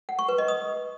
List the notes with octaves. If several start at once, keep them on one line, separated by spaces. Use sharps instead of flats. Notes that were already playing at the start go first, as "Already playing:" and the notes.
F#5
C#6
B4
D#5
D#6